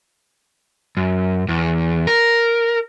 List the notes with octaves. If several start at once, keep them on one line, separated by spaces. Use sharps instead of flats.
F#2
E2
A#4